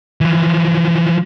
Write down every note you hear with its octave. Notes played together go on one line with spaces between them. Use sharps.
E3 F3